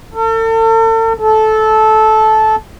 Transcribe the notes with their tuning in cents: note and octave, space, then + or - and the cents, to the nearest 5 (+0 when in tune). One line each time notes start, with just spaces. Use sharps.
A4 +40
A4 -15